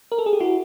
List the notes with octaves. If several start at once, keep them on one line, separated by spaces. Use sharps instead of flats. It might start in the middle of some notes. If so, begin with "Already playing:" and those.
A#4
A4
G#4
G4
E4 F#4